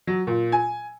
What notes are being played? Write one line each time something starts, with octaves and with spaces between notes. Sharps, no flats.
F#3
A#2
G#5